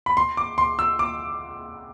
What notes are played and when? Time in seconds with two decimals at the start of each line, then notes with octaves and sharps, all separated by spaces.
0.06 B5
0.17 C6
0.37 D6
0.58 C6
0.79 E6
0.99 D6